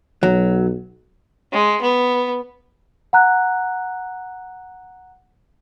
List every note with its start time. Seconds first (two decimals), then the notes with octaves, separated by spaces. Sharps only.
0.23 B1 F#3
1.52 G#3
1.82 B3
3.13 F#5 A#5 F#6